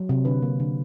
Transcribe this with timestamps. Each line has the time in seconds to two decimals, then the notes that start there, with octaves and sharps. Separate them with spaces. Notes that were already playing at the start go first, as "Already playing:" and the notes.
Already playing: F#3
0.09 C3
0.25 D3 B4
0.42 A#3
0.60 D3